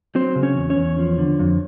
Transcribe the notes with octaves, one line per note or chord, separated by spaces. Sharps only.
F#3 C4 C5
C#3
C#4 C#5
E2
C#4 C#5
E2
F3
D3
F2